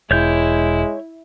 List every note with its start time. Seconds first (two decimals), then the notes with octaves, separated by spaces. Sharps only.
0.11 E1 G#3 E4 C#5 G6